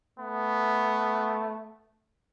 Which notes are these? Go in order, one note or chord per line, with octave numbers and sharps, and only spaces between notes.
A3 B3